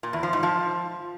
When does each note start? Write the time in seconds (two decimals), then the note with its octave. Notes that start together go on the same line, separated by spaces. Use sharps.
0.03 A#2
0.13 E2
0.23 F3
0.33 G#2
0.43 F3